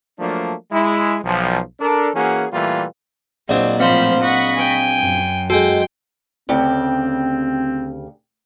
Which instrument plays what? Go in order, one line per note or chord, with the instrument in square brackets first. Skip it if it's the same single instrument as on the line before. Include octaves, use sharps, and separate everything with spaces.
[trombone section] F3 F#3 A3 A#3 D4
G#3 E4
B1 F3
D4 A4 A#4
E3 A#3 C#4 F#4 G#4
A#2 E3 G3 A3 A#3 F4
[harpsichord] A#1 F#3 [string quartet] C4 [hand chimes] D5 D#5
[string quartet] A2 F3 [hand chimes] C4 F5 [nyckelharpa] C5 B5
[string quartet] D#5 B5 C#6 [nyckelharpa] F#5
[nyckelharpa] G5 G#5
[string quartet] F#2
[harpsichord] G#3 A4 [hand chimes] F#4 G#5 [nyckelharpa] G5
[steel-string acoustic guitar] D2 C#3 G4 [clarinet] C4